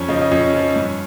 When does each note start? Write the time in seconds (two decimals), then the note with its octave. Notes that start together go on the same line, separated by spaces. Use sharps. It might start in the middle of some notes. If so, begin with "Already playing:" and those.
Already playing: F2 C#4
0.08 C#3 F3 D#4
0.21 D#4
0.31 F2 C#4
0.53 C#3 F3
0.76 G2